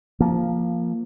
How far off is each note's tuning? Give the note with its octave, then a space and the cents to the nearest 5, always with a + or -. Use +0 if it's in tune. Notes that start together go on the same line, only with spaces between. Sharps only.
F3 -5 A#3 +0